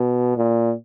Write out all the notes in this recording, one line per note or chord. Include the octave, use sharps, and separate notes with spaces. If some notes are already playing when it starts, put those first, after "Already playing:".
Already playing: B2
A#2